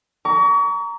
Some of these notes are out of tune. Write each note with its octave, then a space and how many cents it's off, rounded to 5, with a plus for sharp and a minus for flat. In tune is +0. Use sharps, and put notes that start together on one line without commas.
A#5 +0 C#6 +40